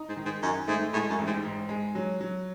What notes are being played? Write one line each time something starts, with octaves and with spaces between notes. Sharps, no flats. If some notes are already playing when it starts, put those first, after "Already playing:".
Already playing: D#4
G#2
D#3
G#2
F#2 D#4
G#2 A3
A2 G#3
F#2
A1
G#2
G#2
G#3
F#3
F#3